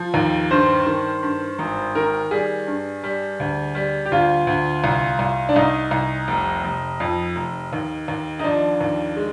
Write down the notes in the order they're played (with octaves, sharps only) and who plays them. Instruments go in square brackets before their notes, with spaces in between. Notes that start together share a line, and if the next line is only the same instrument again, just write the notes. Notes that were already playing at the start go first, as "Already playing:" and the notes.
Already playing: [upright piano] F3
D#2
G2 C5
D#3
G2
G#1
D#3 A#4
G3 G#4
G2
G3
D2
G3
G4
D2 F4
D2
C2
C2
D4
C2 D#4
C2
F1
F1
F2
F1
D#2
D#2
D#4
F3 D4
D#2
G#3